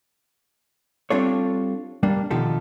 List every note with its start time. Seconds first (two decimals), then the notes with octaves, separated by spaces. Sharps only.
1.10 G3 C4 D4 F4 A4 C#5
2.03 G3 A#3 D4
2.31 B2 D3 D#3 F3 G4 A4